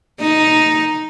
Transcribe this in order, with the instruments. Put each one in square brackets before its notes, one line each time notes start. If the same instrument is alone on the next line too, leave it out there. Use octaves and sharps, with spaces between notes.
[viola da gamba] D#4